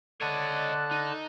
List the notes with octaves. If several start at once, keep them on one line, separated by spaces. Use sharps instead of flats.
D3 C#5 D#5 A5 F#6
D#4